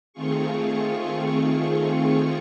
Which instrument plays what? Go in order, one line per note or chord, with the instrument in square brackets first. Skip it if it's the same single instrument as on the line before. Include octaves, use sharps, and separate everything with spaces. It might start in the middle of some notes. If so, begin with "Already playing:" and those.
[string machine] D#3 A3 C4 F4 G#4 C#6